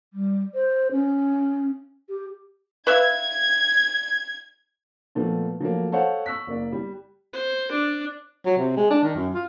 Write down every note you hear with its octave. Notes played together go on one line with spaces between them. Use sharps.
G3
C5
C#4
G4
B4 E5 F5 G#6
A#2 F3 A3 B3
F3 F#3 A3 A#3
A4 C5 C#5 F5 F#5 A5
C#6 E6 F#6 B6
F#1 A#3 D5
G3
C5
D4
F#3
C3
G#3
D4
D#3
F#2
F4